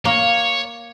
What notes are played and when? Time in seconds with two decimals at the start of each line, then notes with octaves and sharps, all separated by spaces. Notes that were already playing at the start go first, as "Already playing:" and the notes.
0.05 A#3 C#5